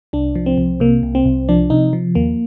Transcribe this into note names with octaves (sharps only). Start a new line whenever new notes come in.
C2 D4
F3
C4
C2
C3 A#3
C2
C4
C2
F3 D4
C3 D#4
F3
D#2 A#3